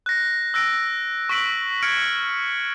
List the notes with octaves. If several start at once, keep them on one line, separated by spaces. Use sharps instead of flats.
F#6 A#6
E6 F#6 A#6 D7
C#6 E6 B6 D7 F#7
F6 G#6 C#7 D7